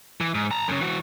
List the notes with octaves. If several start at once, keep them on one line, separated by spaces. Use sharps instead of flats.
E3
G#2
A5 A#5
F#2 C#3
E3 F#4